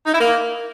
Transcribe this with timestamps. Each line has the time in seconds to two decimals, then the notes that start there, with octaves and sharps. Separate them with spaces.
0.07 D#4
0.14 E4
0.21 A#3